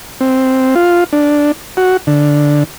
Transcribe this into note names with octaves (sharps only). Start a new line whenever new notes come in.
C4
F4
D4
F#4
D3